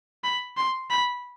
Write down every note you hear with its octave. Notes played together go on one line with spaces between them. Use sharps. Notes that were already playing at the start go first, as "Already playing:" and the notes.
B5
C6
B5